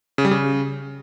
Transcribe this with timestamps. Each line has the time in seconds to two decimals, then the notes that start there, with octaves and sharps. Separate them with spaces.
0.18 C#3
0.25 G3
0.31 C#3